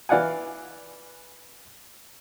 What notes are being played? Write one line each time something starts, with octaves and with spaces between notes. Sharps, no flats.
E3 D5 F5 F#5 G#5